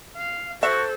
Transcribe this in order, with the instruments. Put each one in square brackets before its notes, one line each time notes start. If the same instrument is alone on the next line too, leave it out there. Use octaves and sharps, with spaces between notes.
[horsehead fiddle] F5
[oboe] F#4 [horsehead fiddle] A4 [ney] C5 [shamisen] E5